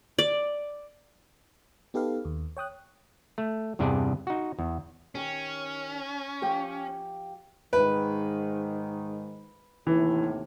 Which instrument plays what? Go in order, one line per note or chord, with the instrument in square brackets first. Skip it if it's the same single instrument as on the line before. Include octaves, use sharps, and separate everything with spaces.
[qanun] D5
[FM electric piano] B3 D#4 G4 A4 B4 F5
D#2
C#5 G5 D#6 F#6
[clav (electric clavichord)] A3
E2 G2 C3 D4 G#4 D5
D#4 F#4
E2
[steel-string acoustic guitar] D#3 G4 [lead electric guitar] C#4
[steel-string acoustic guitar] F3 G4 G5
[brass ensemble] G#2 D#3 [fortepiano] B4
[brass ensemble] D#2 A2 C3 [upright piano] E3